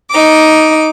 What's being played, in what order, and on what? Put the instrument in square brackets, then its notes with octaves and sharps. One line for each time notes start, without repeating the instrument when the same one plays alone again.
[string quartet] D#4 D6